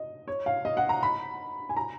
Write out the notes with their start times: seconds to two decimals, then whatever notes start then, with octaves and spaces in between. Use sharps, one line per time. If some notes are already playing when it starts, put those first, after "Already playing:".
Already playing: D#5
0.28 C#5
0.46 F5
0.65 D#5
0.77 F#5
0.89 A#5
1.03 B5
1.69 G#5
1.77 A#5